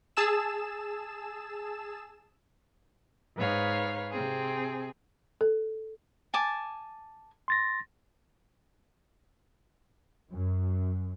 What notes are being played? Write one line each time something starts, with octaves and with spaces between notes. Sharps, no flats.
G#4 A5 E6 E7
G#2 B4 C#5 F5
C3 C4 G#4
A4
G#5 A5 D6
C6 A6 A#6
F#2